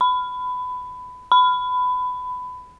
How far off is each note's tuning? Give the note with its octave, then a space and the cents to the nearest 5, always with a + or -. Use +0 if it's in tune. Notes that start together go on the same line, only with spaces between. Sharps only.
B5 +20
B5 +20